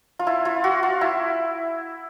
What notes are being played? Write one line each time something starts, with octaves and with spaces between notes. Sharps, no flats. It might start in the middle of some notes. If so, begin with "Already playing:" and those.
F4
E4
F4
F#4
F4
E4